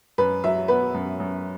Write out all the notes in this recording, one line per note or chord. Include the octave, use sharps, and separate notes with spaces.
F#2 B4
F#3 E5
B3 B4
F#2
F#2